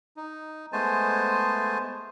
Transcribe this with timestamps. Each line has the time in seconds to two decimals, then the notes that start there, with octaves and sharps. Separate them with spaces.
0.17 D#4
0.73 G#3 A3 B3 C5 G#5 A5